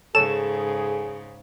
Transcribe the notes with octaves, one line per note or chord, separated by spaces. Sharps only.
G#2 C#3 G#4 A4 C#5 E7